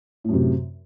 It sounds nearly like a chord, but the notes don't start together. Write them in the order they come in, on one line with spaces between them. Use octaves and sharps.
A2 F#2 C3